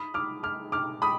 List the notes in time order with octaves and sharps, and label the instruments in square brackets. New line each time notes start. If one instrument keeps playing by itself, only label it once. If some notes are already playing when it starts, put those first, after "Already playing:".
Already playing: [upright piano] B5 D#6
D6 F6
D6 F6
D6 F6
B5 D#6